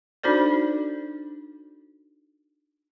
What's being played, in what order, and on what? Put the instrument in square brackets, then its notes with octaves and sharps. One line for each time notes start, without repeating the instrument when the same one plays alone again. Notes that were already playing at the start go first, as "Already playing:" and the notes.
[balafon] D4 D#4 F#4 A4 C5 D5